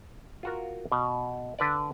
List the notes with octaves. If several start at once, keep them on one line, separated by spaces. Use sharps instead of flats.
F4 F#4 A#4
B2
D3 B4 D5